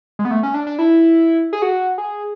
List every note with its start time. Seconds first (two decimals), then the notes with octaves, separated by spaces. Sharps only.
0.19 G#3
0.25 B3
0.31 A3
0.43 C#4
0.54 D4
0.67 D4
0.79 E4
1.53 G#4
1.62 F#4
1.98 G#4